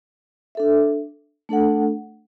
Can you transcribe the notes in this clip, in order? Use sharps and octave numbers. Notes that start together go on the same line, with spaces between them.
D4 A4 E5
A3 D4 A4 F#5